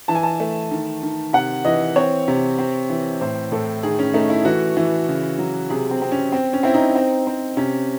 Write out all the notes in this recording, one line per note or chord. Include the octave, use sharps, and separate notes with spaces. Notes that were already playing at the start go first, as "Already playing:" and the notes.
E3 A5
G#5
A5
A3
D#3
D#3
C3 F#5
E3 D#5
C4 C#5
C3
C4
E3
A2 C5
A2 A4
D#3 G#4
C#4
A3 D#4
E4
E3 F#4
E3
C#3
F#3
C3 G#4
C4
C4
C#4
C4
C#4
C4 E4
D#4
C4
C4
C3 C#4